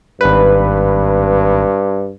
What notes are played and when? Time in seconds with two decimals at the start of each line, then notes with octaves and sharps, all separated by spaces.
0.21 G#1 G2 B4